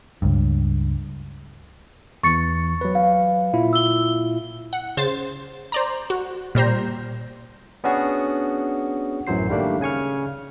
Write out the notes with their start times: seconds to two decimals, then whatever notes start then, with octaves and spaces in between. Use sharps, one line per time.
0.22 C#2 G2
2.23 E2 E3 C#6 A6 C#7
2.81 F#3 B4
2.95 F5
3.53 A#2 E4 F4
3.73 E6 G7
4.73 F#5
4.97 C#3 C5 A6
5.72 C5 D5 A#5
6.10 F#4
6.55 A#2 G3 C5 A#5
7.84 B3 C#4 D4 F#4 G#4
9.27 A1 F#2 E3 F#3 C5 C7
9.49 D#3 G3 A3 A#3 D4
9.81 C#3 G#5 C#6 F6